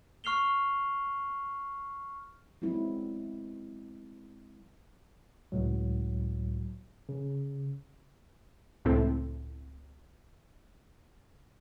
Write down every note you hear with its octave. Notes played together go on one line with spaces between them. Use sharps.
C#6 F6 C7 F7 G7
F#3 G#3 B3 C4 E4
C#2 A2 F#3
C#3
C#2 A2 C4 E4 A4